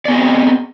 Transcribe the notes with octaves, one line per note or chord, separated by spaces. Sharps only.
B3 C4 G#4 D5 D#5